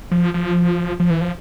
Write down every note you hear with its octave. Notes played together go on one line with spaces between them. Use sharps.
F3
F3
F3
E3
F3